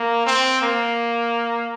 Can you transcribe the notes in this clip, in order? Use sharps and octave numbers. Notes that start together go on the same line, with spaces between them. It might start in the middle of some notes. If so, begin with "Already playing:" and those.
Already playing: A#3
C4
A#3